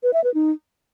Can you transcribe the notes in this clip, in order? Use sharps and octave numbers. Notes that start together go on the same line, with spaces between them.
B4
E5
B4
D#4